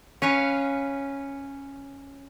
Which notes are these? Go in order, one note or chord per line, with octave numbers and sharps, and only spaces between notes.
C#4 B4 C#5 F5